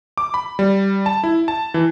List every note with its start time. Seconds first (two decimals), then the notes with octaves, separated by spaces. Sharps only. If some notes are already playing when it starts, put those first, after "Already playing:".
0.18 D6
0.34 B5
0.59 G3
1.06 A5
1.24 E4
1.48 A5
1.74 E3